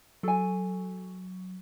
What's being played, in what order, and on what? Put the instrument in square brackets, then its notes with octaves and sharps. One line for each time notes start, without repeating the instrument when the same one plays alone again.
[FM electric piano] F#3 [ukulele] A4 G#5